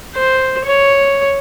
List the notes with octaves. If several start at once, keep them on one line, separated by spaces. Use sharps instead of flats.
C5
C#5